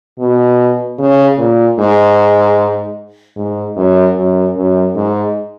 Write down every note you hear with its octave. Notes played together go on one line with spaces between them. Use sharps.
B2
C#3
A#2
G#2
G#2
F#2
F#2
F#2
G#2